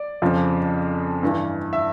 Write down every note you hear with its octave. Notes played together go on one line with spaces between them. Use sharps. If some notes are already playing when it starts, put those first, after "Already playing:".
Already playing: D5
F2 C#3 F3
G2 E3
E5